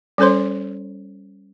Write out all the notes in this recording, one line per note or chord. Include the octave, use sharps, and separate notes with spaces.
G3 C#4 A4 C5 C#5 C6